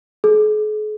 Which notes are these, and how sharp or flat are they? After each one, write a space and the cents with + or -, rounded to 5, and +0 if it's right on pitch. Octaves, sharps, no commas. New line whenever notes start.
G#4 +45